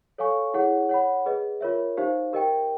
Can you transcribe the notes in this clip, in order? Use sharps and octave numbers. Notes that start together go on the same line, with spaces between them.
A4 C#5 F5 G#5 C#6
E4 G#4 C#5 F#5
C#5 F#5 B5
G#4 B4 D#5
F4 A#4 C#5 E5
D#4 G4 C5 F5
G4 A#4 D#5 G5